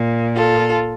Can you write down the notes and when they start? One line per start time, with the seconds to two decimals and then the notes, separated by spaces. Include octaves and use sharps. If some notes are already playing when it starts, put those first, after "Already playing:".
Already playing: A#2
0.36 F4 A4